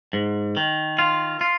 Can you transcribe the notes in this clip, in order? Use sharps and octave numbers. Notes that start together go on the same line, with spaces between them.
G#2
D#3
F4
F4